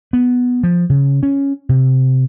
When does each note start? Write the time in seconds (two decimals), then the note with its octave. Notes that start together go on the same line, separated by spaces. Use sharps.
0.13 B3
0.63 F3
0.90 C#3
1.23 C#4
1.69 C3